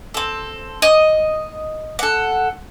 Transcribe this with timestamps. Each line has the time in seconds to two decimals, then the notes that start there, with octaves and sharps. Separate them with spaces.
0.14 C4 A4
0.82 D#5
1.99 A4 F#5